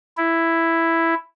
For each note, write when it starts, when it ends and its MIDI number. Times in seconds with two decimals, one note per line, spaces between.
0.17 1.14 64